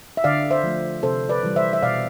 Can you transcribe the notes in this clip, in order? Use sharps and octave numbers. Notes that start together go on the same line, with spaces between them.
E5
D3 D5 F5
C5 E5
F3 A3
C3 A4 C5
B4 D5
E3 G3
C5 E5
E5
B2 D5 F5